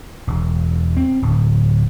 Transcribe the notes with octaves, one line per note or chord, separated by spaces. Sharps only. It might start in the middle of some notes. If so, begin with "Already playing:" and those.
E1
C4
D1